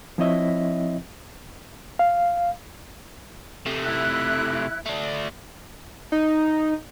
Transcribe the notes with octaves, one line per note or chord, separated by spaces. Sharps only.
F3 C4 E4 C#5 D#5 E5
F5
C3 A3
E4 F#6
A3 D4
D#4